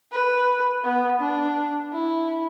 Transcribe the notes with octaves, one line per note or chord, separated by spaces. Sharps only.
B4
B3
D4
E4